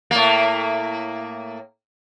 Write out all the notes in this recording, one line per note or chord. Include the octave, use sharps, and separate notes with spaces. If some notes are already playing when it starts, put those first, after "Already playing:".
A2 A#3